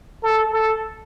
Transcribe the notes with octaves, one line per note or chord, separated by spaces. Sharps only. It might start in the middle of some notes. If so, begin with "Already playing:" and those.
A4
A4